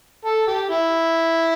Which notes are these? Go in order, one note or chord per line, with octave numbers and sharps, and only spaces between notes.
A4
G4
E4